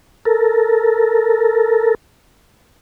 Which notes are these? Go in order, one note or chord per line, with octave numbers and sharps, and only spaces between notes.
A4 A#4